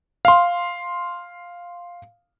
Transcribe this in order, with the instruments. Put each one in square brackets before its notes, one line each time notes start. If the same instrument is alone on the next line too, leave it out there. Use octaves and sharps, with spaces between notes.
[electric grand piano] F5 C6